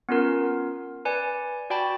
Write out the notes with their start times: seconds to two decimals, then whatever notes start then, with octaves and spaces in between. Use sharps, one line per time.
0.09 B3 C#4 F4 A#4
1.05 B4 D5 G#5
1.70 F#4 D5 G5 A5 B5